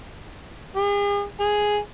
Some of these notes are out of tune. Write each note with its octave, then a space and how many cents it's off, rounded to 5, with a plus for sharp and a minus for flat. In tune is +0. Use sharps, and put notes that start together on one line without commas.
G#4 -45
G#4 +0